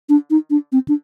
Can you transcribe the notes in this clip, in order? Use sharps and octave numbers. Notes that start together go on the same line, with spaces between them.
D4
D#4
D4
C4
D4